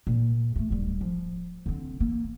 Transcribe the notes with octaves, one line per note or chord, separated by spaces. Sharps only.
A#2
G#3 A3
D1 G3
F3
D3 C4
E3 A#3